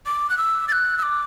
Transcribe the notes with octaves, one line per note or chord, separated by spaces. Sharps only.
D6
F#6
E6
A6
F#6
E6
D6